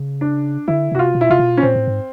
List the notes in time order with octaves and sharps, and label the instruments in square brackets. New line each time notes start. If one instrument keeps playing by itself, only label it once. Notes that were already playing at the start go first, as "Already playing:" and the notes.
Already playing: [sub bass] C#3
[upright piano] D4
[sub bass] D3 [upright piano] E4
[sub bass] C3 [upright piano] F#4
[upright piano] F4
[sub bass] B2
[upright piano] E4
[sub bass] C3 [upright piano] F4
[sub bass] B2
[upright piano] C#4
[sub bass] A#2 [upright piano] C4
[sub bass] A2
G#2